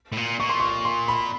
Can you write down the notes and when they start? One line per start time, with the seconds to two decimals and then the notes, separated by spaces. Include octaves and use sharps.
0.12 A2
0.17 A#2
0.40 A#2 C#6
0.49 C6
0.60 C#6
0.85 C6
1.08 B5